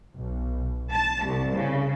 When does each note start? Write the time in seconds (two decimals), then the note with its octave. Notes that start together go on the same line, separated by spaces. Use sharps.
0.15 B1
0.92 A5
1.26 C2
1.55 C#3